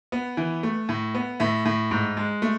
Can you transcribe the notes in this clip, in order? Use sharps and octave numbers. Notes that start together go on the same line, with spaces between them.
B3
E3
A3
A2
B3
A2 E5
A2
G#2
G#3
A3